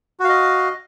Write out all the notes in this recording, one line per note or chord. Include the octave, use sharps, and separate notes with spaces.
F#4 D#5 F5